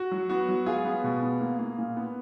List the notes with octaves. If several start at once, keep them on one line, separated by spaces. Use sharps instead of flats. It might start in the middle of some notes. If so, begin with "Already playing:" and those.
Already playing: F#4
F#3
B3 F#4
F#3
G#3 F4 G#4
B3
B2
B3
A#3
A#3
A#2
B3